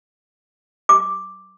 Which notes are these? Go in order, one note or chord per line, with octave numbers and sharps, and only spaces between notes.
D6